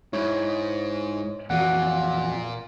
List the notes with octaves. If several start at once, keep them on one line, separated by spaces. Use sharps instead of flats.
G#2 E4 C#5
F2 A#2 E3 F3 F#4 F#5